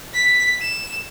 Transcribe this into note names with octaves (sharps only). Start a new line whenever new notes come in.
B6
E7